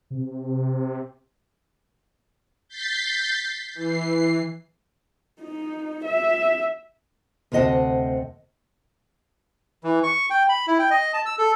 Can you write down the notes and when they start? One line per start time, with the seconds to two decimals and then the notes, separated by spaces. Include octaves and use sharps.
0.10 C3
2.68 G6 A6 B6 C7
3.74 E3 C7
5.41 D#4
6.05 E5
7.52 D2 C3 C4 D#5 F#5 A5
9.84 E3
10.03 C#6
10.30 G5
10.49 B5
10.67 E4
10.79 G5
10.91 D#5
11.14 A5
11.26 E6
11.39 A4